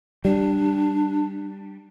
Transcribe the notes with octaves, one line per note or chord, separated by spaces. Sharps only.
G3 D4